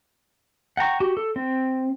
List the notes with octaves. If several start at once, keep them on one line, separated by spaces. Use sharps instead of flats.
F#5 G5 A#5 C#6
F#4 G4
A4
C4